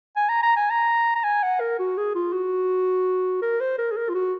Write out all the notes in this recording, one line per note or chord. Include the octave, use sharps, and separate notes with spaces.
G#5
A#5
A#5
G#5
A#5
A#5
G#5
F#5
A#4
F#4
G#4
F4
F#4
A#4
C5
A#4
G#4
A#4
F4
F#4